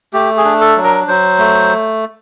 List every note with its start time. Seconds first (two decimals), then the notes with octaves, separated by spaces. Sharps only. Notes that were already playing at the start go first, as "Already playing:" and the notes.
0.13 A3 G4
0.37 G#4
0.45 D4
0.61 A4
0.77 F#3
0.84 A#4
1.08 F#3 C5
1.38 A3